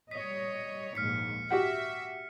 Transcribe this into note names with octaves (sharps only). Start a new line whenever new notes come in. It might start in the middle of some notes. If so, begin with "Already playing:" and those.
G3 C#5 D#5 B6
A#1 D#2 G#2 F6 B6 C#7
F#4 G4 E5 F#5